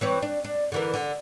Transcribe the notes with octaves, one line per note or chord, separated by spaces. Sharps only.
E3 C4 C#5
D4
D4
D3 E3 A#4
D3